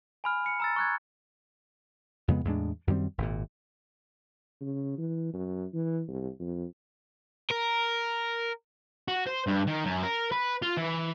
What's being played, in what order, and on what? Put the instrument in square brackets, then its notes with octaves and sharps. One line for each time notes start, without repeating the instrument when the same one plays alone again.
[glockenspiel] G#5 B5 F6
C#7
A#5 E6 A6
C#6 F#6 G#6
[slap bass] F2 C#3 G#3 B3
E2 A2 G#3 D4
F#2 D#3 G3 C4
G#1 A#2
[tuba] C#3
E3
F#2
E3
C2
F2
[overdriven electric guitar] A#4
[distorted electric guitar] F#4
C5
G2
D#3
F#2
A#4
B4
F4
E3